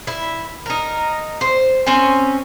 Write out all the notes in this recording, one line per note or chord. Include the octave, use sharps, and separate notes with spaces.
E4
D#4 A#4
C5
C4 C#4 G#5